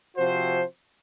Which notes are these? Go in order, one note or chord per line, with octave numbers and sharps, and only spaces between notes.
C3 F3 C4 F#4 C5